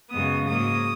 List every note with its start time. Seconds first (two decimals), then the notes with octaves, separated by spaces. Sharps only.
0.11 F#2 C#3 G#3 B3 D#6
0.47 G#2 F#3 A#3 D#6